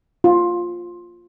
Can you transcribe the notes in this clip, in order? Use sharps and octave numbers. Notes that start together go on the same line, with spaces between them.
F4